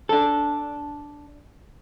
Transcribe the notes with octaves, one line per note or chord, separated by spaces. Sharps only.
D4 A4